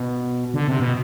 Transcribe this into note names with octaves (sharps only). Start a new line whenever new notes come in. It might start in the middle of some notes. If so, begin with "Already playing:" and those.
Already playing: B2
D3
C3
B2